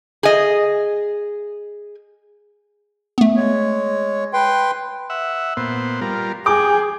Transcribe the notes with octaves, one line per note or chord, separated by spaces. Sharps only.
G#4 D#5
A3 B3
G#3 C#5
B4 G5 C6
E5 F#5
A#2 B3 C5
G3 F4 A#4
G#4 G5 D6